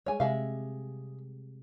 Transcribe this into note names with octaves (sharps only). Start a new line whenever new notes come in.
G3 G#3 G#4 C#5 G#5
C3 G#3 G4 E5 F5